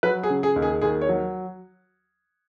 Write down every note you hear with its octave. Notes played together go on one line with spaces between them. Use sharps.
F#3 B4
G#4
C#3
G#4
D#2
G#4
D#2 G#4
C#5
F#3